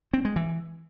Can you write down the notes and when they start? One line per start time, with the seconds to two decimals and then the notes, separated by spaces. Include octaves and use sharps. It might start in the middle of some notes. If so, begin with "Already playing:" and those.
0.13 C4
0.25 G#3
0.36 E3